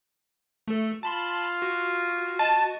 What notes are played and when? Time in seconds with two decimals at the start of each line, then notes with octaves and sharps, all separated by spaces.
0.68 A3 A4
1.03 F4 A5 B5 C6
1.62 F#4
2.39 D#5 A5